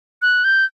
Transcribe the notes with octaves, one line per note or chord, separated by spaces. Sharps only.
F#6
G6